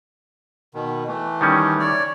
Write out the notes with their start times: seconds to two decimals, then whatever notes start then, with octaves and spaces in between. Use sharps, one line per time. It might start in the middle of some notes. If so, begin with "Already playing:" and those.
0.74 B2 D#3
1.08 E3 A3
1.41 D#3 G3 C#4
1.80 C#5 D5